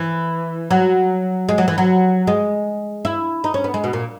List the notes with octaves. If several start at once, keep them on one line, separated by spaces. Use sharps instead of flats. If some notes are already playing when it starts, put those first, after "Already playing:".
Already playing: E3
F#3
G#3
F#3
E3
F#3
G#3
E4
D#4
C#4
B3
G#3
B2
A#2